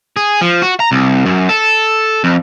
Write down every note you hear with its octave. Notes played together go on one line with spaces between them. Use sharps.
G#4
F3
F#4
A#5
C2
F#2
A4
F2